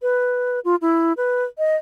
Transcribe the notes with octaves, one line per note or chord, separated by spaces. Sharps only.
B4
F4
E4
B4
D#5